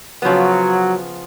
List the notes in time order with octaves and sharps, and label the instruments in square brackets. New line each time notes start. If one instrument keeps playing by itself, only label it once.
[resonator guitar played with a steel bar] C#3 F3 B3 [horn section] F#3